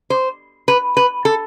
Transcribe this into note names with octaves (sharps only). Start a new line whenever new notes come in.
C5
B4
B4
A4